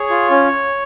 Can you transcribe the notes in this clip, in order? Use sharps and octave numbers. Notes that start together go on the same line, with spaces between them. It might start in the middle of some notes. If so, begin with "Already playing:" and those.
Already playing: G#4 C#5
F4
C#4